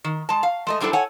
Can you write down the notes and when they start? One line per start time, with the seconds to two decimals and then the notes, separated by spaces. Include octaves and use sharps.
0.04 D#3
0.29 G#3 A5
0.43 F5
0.67 G#3 A3 D#5
0.80 F#2 G3 D4 E4 A4 C5
0.93 A4 C#5 F#5 G#5